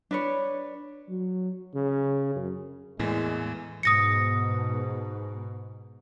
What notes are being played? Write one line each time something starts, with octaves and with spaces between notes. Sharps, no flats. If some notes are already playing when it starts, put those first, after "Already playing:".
D4 B4 C#5
F#3
C#3
F#2
E2 A2 E3 G#3 A#3
G#2 B2 D#6 A#6 C#7